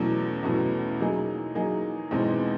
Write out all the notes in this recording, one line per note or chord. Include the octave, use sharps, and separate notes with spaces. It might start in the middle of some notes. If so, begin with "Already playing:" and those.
Already playing: E2 B2 F#3 A3 C#4
E2 B2 F#3 A3 C#4
F#3 A#3 D#4 G#4
F#3 A#3 D#4 G#4
E2 B2 G#3 C4 D#4